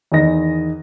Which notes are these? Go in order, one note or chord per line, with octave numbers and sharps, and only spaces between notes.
E2 D#3 D#5 A#6